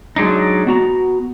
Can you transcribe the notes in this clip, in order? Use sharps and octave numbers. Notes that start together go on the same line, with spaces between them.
F#3 G#3 D4 D#4
B3 F#4 A#5